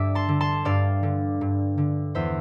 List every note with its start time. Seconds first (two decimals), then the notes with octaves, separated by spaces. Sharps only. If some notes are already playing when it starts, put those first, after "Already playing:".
Already playing: G2 D3 D5 E5 D6
0.15 A5 C6
0.28 D3
0.41 A5 C6
0.65 G2 D5 F5
1.03 D3
1.41 G2
1.78 D3
2.15 E2 C5 E5